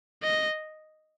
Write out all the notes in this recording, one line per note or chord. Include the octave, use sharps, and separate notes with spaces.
D#5